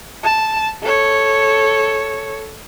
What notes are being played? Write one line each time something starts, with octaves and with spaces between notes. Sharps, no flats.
A5
A4 C#5